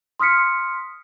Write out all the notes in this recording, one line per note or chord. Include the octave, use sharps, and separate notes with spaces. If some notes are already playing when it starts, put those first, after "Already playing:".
C6 D#6 F6 B6 C#7